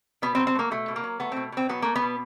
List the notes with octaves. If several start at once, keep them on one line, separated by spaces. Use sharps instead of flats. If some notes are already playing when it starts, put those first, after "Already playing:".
B2 B3
C4
F#3
C4
A3 A#3
B2 A3
B2
A#3
F#3
A3 B3
B2 C4
B2 C4
F#3 B3
A3 A#3
B3
B2